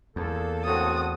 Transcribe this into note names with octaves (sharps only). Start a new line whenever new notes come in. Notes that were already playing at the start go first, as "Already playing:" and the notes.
E2 A#3 A4
A2 C4 F#4 D#6